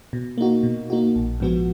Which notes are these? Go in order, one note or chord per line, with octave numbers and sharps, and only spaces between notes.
B2
A#3 D#4 F#4
B2
A#3 D#4 F#4
A#1
G#2 F3 B3 F#4